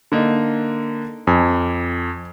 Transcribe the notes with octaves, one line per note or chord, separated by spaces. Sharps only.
D3 A#3 D#4
F2 G#5